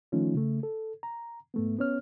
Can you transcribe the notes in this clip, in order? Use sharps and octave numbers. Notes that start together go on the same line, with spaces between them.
D#3 F3 A3 C#4 D#4 F4
C#3 A3
A4
A#5
G#2 A3 B3
B3 C#4 C#5 F6